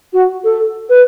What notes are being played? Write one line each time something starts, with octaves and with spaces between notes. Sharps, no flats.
F#4
A4
B4